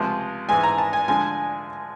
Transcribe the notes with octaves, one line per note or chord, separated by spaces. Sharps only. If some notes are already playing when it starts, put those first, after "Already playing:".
Already playing: C#2 C3 F3 G#3
G#2 E3 G#3 G#5
A#5
A5
G#5
D3 F3 G#3 G#5